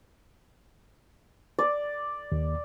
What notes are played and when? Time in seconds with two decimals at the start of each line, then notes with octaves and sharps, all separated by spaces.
1.59 D5
2.32 D#2